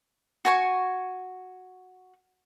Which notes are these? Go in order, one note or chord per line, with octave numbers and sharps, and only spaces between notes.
F#4 G#5 C#6